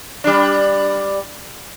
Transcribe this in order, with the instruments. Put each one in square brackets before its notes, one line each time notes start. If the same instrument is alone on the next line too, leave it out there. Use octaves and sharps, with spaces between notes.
[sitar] G3 D4